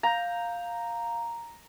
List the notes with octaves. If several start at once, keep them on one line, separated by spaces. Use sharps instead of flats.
F5 A#5 G6